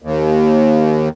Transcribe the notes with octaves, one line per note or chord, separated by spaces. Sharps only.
D#2